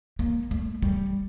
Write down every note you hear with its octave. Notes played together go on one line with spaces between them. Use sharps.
A#3
A3
G3